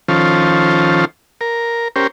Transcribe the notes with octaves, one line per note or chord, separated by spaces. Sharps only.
D#3 F3 C#4 F4 A4 C5
A#4
C#4 G4 A#4 C5